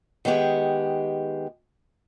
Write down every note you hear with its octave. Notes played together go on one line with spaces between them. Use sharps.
D#3 G#3 B3 G4 G#4